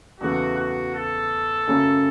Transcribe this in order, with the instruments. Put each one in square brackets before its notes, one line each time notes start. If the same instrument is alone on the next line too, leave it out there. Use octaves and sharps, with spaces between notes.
[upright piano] E2 C#3 E3 A3 [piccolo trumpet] F#4
[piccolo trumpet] F#4
A4
[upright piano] F#2 C#3 A3 C#4